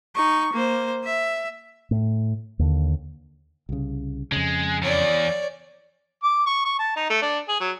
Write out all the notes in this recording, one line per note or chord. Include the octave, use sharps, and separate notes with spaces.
D#4 C#6
A#3 C5
E5
A2
D#2 D3
C2 C#3
F2 C#3 G#3
E2 C#5 D5
D6
C#6
C#6
A5
D#4
A3
D4
G#4
F#3